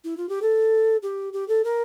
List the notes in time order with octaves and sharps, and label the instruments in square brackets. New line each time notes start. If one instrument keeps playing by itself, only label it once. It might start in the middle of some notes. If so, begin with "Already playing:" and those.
[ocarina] E4
F4
G4
A4
G4
G4
A4
A#4